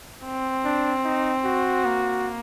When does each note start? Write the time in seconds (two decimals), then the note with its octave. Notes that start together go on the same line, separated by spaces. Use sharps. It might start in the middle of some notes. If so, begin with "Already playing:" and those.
0.25 C4
0.65 D4
1.04 D#4
1.45 F#4
1.85 A#3